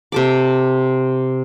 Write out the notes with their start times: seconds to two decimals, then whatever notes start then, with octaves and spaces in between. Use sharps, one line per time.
0.12 C3 A4 D6